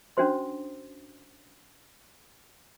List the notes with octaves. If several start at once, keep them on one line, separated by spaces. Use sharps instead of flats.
C#4 D4 F#4 C5 C6